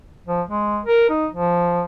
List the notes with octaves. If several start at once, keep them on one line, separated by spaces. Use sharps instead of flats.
F3
G#3
A#4
D#4
F3